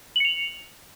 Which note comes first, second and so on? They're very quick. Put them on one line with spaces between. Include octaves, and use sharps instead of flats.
F#7 C#7 F7